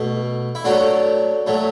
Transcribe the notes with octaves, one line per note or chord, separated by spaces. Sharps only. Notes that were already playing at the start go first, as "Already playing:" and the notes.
Already playing: B2 A3
E4
A2 F#3 A3 D4 F#4
A2 F#3 A3